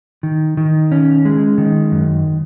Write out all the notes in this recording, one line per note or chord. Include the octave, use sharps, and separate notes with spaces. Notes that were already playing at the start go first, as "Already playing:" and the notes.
D#3
D#3
C#4
G#3
D#3
F#2